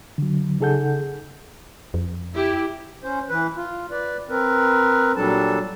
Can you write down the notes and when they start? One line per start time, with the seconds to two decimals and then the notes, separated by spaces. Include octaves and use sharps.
0.18 D3 F#3
0.60 C#3 D#4 G#4 A4 F#5 G6
1.94 F2
2.34 E4 G4
3.04 C#4 C5
3.30 E3 B4
3.56 F4
3.91 B4 D5
4.29 C4 A#4 B4
5.16 A#2 F#3 G3 D4 A4 A5